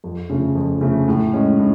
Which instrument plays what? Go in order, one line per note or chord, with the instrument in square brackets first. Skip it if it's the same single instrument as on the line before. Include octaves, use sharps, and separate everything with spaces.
[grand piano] F2
C#3 F3 A3
F2
C#3 F3 A3
A2
G#3 C#4
A2